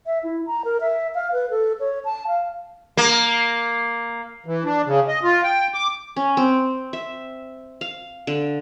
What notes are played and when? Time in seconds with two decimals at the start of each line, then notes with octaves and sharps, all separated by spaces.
0.06 E5
0.24 E4
0.47 A#5
0.65 A#4
0.81 E5
1.15 F5
1.33 B4
1.50 A4
1.80 C#5
2.05 A5
2.27 F5
2.97 A#3
4.46 E3
4.65 D4
4.86 C#3
5.08 D#5
5.23 F4
5.44 G5
5.74 D6
6.16 C#4
6.37 C4
6.93 E5
7.81 F5
8.27 D3